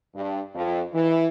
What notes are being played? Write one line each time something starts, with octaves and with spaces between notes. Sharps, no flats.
G2
F2
E3